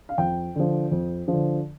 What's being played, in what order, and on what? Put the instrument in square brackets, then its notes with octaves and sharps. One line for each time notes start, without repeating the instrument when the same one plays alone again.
[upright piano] F5
F2 G5
D3 F3
F2
F3
D3